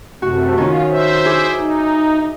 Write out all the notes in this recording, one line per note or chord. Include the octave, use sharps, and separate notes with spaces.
F#2 C3 A3 F#4
D#3 C#4 F4
C5 E5
E4 G#4 D6
D#4